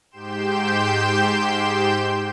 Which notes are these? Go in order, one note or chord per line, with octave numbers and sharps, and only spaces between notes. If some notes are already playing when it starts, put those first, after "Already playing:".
G#2 G4 G5 C6 G6 E7